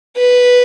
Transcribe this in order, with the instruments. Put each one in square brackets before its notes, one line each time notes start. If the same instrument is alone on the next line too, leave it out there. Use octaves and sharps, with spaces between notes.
[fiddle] B4